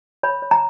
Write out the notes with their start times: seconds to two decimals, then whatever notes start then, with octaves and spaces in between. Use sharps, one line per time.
0.23 C#5 B5
0.42 C#5
0.51 A#5